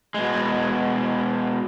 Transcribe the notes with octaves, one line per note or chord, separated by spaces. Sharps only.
B2 G#3